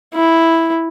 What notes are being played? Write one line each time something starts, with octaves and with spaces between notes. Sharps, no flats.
E4